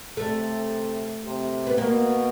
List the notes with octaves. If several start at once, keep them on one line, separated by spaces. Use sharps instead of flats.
C3 A3
C3
B3
B2 A#3